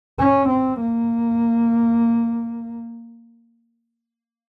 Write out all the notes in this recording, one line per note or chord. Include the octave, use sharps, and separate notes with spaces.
C#4
C4
A#3